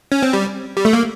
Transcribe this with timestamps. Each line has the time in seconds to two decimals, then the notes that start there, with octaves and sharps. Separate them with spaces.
0.12 C#4
0.23 C4
0.33 G3
0.77 G3
0.85 A3
0.93 A#3